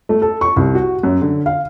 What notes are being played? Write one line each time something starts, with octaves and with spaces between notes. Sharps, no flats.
A3
A4
C#6
C2
F#4
F#2
D3
F5